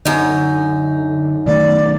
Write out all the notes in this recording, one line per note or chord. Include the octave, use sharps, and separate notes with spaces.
F#2 D3 D#4
B1 D#3 A3 D5